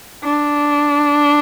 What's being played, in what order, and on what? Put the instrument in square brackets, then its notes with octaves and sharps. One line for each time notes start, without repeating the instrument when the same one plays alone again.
[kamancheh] D4